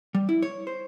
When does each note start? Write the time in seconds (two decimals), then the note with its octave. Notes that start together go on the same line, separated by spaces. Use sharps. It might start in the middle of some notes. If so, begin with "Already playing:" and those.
0.15 G3
0.29 E4
0.42 C#5
0.67 C5